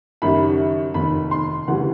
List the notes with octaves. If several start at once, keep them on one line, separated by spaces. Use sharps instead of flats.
F#1 F#2 D#3 G3 B5
F1 D#2 D#3 B5
C6
D2 C#3 E3 G3 F#5